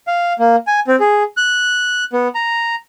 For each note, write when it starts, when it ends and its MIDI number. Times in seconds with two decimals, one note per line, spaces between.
0.07 0.33 77
0.39 0.56 58
0.67 0.80 80
0.87 0.96 60
1.00 1.23 68
1.37 2.04 90
2.13 2.28 59
2.35 2.75 82